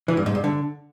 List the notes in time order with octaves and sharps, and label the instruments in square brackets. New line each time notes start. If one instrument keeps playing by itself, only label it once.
[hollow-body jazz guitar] E3
G2
G#2
G2
D3